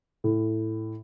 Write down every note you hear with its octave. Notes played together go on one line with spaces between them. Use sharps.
A2